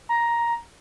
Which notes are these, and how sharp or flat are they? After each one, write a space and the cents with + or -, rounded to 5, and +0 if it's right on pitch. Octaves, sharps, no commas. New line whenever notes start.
A#5 +10